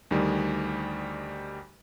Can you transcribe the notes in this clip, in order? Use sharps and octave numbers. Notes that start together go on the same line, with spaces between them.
D2 D#3 G3